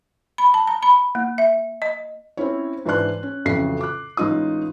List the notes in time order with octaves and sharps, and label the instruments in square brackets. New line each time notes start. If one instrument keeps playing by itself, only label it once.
[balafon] B5
A5
A#5
B5
A#3
E5
D#5
[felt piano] C4 C#4 E4 C#5
G#2 E3 D4 D5 C6 F#6
C#4
A1 F2 A2 C#3 F#3 C7
D6 F#6
A1 G#3 D#4 F4 D#6